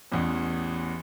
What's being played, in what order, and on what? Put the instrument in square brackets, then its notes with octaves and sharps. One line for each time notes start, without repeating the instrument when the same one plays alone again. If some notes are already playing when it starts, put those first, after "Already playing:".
[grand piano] A1 E2